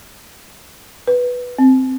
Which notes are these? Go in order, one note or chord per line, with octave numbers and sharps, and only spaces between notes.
B4
C4